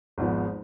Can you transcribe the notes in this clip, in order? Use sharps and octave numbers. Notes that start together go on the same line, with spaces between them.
G#1 G#2 F3 G#3 B3